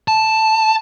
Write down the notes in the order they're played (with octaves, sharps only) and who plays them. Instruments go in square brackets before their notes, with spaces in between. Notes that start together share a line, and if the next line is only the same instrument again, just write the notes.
[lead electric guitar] A5